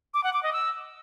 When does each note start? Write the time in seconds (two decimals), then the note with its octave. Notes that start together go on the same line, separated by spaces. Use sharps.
0.14 D6
0.24 F#5
0.33 D6
0.43 D#5
0.53 E6